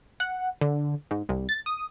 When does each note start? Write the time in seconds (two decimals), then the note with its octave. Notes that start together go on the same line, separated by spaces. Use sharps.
0.20 F#5
0.61 D3
1.11 G#2
1.29 C2
1.49 A6
1.66 D#6